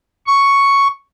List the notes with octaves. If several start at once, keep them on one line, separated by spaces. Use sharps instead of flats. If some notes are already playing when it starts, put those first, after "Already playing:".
C#6